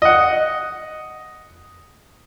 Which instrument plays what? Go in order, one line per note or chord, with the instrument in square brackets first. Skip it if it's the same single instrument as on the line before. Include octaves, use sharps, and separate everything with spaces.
[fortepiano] D#5 F#5